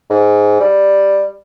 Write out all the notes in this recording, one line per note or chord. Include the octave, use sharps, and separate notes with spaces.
G#2
G3